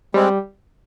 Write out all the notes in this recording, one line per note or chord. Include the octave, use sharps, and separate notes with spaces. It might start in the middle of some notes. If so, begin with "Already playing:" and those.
G3 G#3 C4